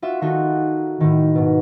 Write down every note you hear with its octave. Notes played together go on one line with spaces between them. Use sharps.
F4 F#4 E5 E6
D#3 D#4 F4 F#4 A4
A2 D#3
G#2 B2